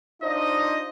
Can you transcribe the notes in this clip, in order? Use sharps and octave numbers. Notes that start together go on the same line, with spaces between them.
D4 D#4 F4 C5 D#5